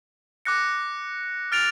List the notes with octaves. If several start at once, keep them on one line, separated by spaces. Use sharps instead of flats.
D6 F#6 A#6 C#7
F6 A6 D7 F7